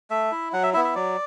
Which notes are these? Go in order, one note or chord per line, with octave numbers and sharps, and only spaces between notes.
A3 E5
E4
F#3 F#5
E5
B3 E4 E5
E5
F#3 D5